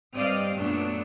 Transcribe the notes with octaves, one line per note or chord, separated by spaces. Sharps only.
G2 C4 D5 D#5 F5
F#2 A#2 F#3 A3 B3 D4